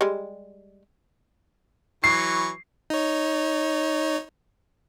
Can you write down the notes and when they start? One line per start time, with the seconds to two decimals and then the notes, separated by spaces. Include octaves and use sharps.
0.01 G3 G#3
2.04 E3 F#3 C#6 C7
2.90 D#4 C#5